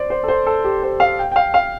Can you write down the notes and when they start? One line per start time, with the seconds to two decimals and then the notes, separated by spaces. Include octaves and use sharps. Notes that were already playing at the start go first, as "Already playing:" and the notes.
Already playing: C5 D5
0.10 C5
0.24 A4
0.28 C5
0.46 A4
0.64 G4
0.83 C5
1.00 F5
1.19 G5
1.31 G5
1.36 F5
1.54 F5